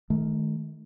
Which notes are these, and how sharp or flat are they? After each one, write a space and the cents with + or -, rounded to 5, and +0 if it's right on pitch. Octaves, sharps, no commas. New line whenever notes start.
D#3 +0 A3 -40